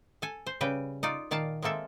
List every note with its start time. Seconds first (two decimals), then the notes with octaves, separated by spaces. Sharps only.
0.22 A4 G#5
0.47 C5
0.61 C#3 G3 B4 G5
1.03 D#4 F4 D5
1.31 A#2 D#3 D5 F5 A5
1.62 G#3 A#3 C4 A4 E5